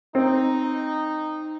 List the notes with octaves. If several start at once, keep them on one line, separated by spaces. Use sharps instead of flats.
C4 D#4